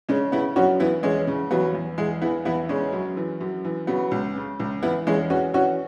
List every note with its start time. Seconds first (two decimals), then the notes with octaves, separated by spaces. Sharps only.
0.09 C#3 G#3 C#4
0.32 C#3 B3 E4
0.56 F#2 C#4 F#4
0.80 E3 B3 E4
1.03 E2 G#3 C#4
1.27 C#3
1.51 E2 F#3 B3
1.74 E2
1.98 E2 G#3
2.22 E3 B3 E4
2.45 E2 B3 E4
2.69 C#3 G#3 C#4
2.92 F#2
3.17 E3
3.41 F#2
3.65 E3
3.87 C#3 F#3 B3
4.11 C#2
4.36 C#3
4.60 C#2
4.83 E3 B3 E4
5.07 E2 G#3 C#4
5.30 E3 C#4 F#4
5.53 E3 C#4 F#4